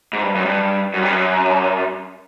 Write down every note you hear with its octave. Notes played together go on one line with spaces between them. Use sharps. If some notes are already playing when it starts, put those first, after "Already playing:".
G#2
G2
F#2
G2
F#2
G2
F#2